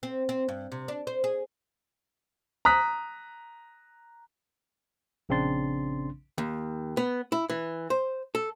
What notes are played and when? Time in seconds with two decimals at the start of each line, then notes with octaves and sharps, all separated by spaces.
0.03 C4
0.29 C4
0.49 G2
0.72 C3
0.88 D4
1.07 C5
1.24 G#4
2.65 A#5 D#6 F#6 B6
5.29 A#1 C#3 C4 D4 C6 A6
6.38 D#2
6.97 B3
7.32 E4
7.50 E3
7.90 C5
8.35 A4